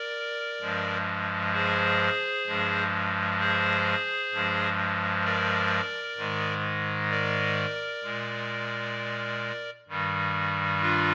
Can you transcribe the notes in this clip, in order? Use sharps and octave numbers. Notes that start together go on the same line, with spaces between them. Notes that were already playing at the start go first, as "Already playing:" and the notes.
Already playing: A#4 D5
G2 F3 G#3
G#4 C5
G2 F3 G#3
G#4 C5
G2 F3 G#3
A#4 D5
G#2 D#3 G#3
A#4 D5
A#2 G#3
G2 D#3 G3
D4 F4